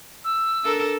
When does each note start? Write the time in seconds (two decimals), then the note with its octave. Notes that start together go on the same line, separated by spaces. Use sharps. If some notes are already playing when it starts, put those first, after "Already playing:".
0.24 E6
0.63 D4 A4 A#4